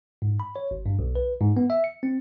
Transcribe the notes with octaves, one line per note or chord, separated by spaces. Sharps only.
G#2
B5
C#5
G#1
G2
B1
B4
G#2
B3
E5
C#7
C4